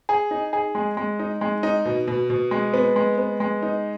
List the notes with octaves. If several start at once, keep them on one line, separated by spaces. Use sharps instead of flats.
G#4
D#4
G#4
G#3
G#3
D#4
G#3
D#4
B2
B2
B2
G#3
B3
G#3
B3
G#3
D#4